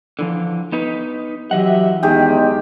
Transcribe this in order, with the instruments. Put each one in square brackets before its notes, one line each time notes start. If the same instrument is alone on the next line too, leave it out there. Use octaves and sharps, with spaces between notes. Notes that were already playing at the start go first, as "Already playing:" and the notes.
[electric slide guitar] D3 E3 F3
B3 D#4 B4
[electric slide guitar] E3 D#5 F#5 [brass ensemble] F#3 G4 E5
[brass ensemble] E2 D#4 [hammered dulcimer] D#3 G#3 G4